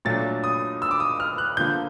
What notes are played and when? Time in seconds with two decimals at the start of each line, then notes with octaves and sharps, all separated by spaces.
0.05 A#2 F#3 A3 D4 A6
0.44 D#6
0.82 E6
0.91 D6
1.00 D#6
1.20 F6
1.38 F#6
1.57 D3 F3 A#3 G6